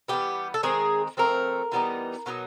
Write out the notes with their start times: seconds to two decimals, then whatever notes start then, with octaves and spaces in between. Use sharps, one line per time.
0.08 E3 G3 B3 G4
0.54 A4
0.63 D#3 G#3 C4 G#4
1.17 F3 A3 C4 A#4
1.72 E3 G3 B3 D#4
2.26 B2 F#3 B3 D#4